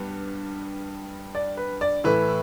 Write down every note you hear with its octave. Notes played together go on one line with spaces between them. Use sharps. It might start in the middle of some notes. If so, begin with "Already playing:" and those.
Already playing: G2 G3 B3
D5
B4
D5
A2 E3 A3 E4 B4